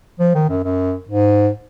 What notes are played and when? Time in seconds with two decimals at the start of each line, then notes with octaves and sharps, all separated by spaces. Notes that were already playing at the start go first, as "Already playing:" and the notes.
0.20 F3
0.35 D#3
0.49 F#2
0.64 F#2
1.09 G#2